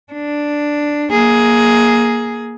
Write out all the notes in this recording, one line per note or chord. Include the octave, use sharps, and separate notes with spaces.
D4
A#3 G#4